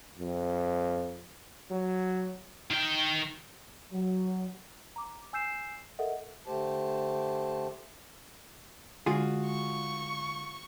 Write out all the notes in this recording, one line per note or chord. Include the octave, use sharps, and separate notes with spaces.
F2
F#3
D#3 G5
F#3
A#5 D6
G#5 E6 G6 C7 E7
A4 A#4 D#5 E5 F#5
D3 A3 G4 C5 A5
D3 G#3 F4 F#4 G#4
C#6